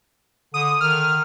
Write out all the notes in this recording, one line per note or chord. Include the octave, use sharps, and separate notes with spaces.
D3 D#6
D#3 F6